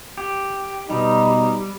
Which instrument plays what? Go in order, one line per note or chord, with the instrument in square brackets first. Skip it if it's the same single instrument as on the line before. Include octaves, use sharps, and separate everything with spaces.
[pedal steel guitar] G4
[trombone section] B2 D#4 [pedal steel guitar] G3